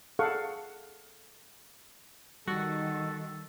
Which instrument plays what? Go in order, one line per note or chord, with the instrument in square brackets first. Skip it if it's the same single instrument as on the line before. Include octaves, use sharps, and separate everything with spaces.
[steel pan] G#4 A4 F5 F#5 C#6
[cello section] D#3 [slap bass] G3 [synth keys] F#4 [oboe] A4